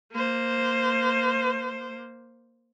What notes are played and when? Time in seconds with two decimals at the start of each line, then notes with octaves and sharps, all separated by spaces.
0.13 A#3 C5